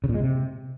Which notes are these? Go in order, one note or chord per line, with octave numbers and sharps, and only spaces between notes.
C#3
A#2
G#3
C3